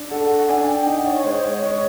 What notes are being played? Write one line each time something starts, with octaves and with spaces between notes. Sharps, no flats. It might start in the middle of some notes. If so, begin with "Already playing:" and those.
Already playing: D4
A4 F#5
F#5
D4 G#5
G5
D#4 F#5
C#5
C#5
G#3 C5
C#5
G#3 C#5